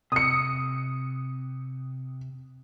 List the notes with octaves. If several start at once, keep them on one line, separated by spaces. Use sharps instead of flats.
C3 D#6 C#7